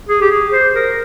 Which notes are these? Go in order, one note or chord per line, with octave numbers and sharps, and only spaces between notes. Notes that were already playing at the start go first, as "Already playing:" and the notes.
G#4
G4
G#4
C5
A#4